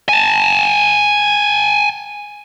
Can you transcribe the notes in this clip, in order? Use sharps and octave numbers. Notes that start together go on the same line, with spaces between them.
G#5 A5